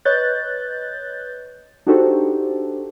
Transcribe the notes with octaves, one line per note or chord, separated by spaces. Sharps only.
B4 C#5 D#5 F#6 G6 A6
D4 D#4 F#4 G4 A4 C5